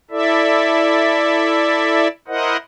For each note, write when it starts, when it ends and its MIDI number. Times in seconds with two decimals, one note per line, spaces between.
0.11 2.08 64
0.11 2.08 69
0.11 2.08 74
0.11 2.08 76
2.28 2.57 64
2.28 2.57 70
2.28 2.57 72
2.28 2.57 75
2.28 2.57 78